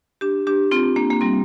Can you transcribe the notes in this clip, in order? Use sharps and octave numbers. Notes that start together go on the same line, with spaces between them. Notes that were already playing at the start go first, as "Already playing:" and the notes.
D4 G4
D4 G4
C4 F4
A#3 D4
A#3
G3 C4